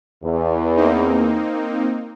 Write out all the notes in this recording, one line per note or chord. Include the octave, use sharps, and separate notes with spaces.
E2
A#3 C4 D#4